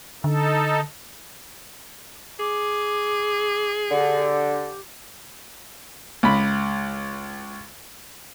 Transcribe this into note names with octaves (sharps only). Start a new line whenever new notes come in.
D3 D#4 A4
G#4 D6
D3 G4
C#2 B5